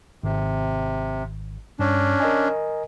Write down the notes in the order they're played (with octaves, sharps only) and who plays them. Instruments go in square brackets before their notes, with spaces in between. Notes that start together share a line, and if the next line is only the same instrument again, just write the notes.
[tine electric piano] G#1 [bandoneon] C3
[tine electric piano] G2 [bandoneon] C#4 D4
[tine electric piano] A#4 D#5 G#5